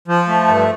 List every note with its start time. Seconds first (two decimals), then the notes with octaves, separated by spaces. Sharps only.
0.08 F3
0.28 A3
0.48 G2